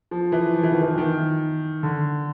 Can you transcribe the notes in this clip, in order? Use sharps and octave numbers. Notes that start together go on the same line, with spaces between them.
F3
E3
F3
E3
D#3
E3
D#3
D3